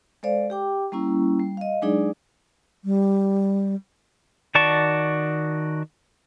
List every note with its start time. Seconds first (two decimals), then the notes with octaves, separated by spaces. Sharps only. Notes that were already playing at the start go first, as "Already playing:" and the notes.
0.23 G#3 A4 C5 D5 F5
0.50 G4 G5 D6
0.92 G3 A#3 C#4 E4
1.39 G3
1.57 D#5 F5
1.82 F#3 G#3 D4 D#4 G#4 D5
2.85 G3
4.55 D#3 F#4 D5 A5 C#6